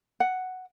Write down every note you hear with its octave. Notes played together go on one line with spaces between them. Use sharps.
F#5